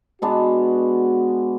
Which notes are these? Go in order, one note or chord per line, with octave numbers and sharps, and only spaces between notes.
B2 G#3 B3 D4 F#4